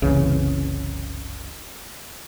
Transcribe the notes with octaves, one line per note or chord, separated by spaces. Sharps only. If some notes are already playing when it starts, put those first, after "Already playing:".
F#1 C2 C#3 E3